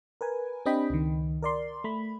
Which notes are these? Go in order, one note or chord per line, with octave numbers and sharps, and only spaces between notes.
A#4 B4 G#5
C4 D4 G4 D#5 G5 B5
C#2 D#3
A#4 D5 C6
A3 B5